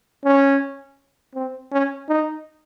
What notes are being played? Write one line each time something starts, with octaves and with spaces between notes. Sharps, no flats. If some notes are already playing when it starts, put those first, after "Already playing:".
C#4
C4
C#4
D#4